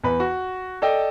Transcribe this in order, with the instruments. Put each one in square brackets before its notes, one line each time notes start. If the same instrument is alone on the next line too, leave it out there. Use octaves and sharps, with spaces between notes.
[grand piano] E2 B4
F#4
A4 D5 D#5 G5